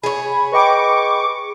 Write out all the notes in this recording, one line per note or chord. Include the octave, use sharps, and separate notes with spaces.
G#4 C#5 B5
B4 D#5 G5 C#6 D6